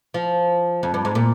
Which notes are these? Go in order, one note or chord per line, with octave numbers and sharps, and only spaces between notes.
F3
F2
G2
G#2
A#2